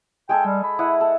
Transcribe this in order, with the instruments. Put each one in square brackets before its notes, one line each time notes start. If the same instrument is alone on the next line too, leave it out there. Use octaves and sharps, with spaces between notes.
[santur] G#3 G#4 A4 [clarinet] G5
[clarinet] G3
B5
[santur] E4 D#5 F#5
A4